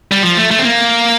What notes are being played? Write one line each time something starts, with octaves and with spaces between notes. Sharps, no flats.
G3
F3
A3
A3
C4
A#3